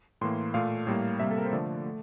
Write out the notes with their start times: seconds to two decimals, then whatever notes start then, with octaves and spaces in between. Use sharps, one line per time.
0.21 A2 E3 A#3 C6
0.54 A#2 A3 F5
0.87 A2 G3 A#3
1.19 C3 G3 A#3 E5
1.31 A4
1.38 A#4
1.45 C5
1.53 D3 F3 A3 D5
1.85 A3